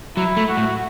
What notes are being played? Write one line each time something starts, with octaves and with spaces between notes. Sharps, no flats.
F#3 E4
A3
F#4
A2